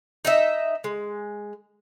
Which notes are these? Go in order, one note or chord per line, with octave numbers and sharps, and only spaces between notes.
D#4 D#5 E5
G#3